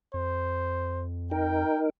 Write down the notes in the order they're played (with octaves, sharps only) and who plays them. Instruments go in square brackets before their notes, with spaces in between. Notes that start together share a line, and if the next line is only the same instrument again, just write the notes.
[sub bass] F2 [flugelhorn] C5
[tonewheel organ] D#4 A#4 [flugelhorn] G5